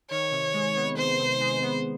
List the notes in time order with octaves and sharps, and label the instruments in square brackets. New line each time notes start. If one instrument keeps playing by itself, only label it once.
[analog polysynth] D#3 [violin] C#5
[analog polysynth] C3
G#3
B3
[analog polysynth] D#3 [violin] C5
[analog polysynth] C3
G#3
B3